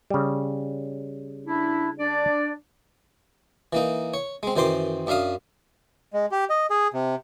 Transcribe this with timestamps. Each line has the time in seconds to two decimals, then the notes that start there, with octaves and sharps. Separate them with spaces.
0.10 C#3 G3
1.47 D4 E4
1.99 D4 D5
3.73 E3 A#3 D#4
4.14 C#5
4.43 G#3 C4
4.56 F#2 D#3 E3 C5 C6 D6
5.07 F#2 D4 E5 F5 D#6
6.13 G#3
6.32 G4
6.50 D#5
6.70 G#4
6.94 C3